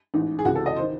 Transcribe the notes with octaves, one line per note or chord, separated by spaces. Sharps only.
A1 G#2 E3 D#4
G#4
C#2 C3 E3 F#4
A4
D#5
C5
D#3